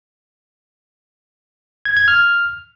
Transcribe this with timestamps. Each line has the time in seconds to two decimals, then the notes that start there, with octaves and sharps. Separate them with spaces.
1.85 G#6
1.97 G#6
2.08 F6